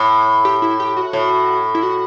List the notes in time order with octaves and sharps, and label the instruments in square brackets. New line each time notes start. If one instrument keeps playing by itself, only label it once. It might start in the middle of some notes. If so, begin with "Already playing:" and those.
Already playing: [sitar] A2
[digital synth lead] G4
E4
G4
F#4
[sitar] A2
[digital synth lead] E4
F#4